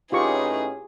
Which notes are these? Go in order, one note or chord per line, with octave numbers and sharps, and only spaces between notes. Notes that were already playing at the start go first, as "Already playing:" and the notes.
A2 C#4 D#4 F4 G4 G#4 B4 C#6